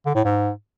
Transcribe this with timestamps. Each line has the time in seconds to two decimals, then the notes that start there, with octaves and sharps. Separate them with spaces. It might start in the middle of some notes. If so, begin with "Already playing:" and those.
0.06 D3
0.15 A2
0.24 G#2